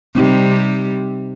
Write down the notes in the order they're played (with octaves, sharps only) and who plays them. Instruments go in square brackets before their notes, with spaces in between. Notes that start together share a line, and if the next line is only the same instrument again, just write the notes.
[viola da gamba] C3 G3 [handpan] C4 D#4 G4